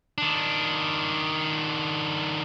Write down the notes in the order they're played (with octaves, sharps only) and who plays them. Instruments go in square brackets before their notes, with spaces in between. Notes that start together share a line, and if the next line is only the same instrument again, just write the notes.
[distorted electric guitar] D#3 D4